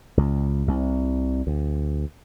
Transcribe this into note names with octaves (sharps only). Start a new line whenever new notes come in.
C#2
C2
D2